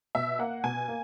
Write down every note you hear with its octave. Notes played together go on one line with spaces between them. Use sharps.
B2 E5
A#3 F#5
B2 G#5
A#3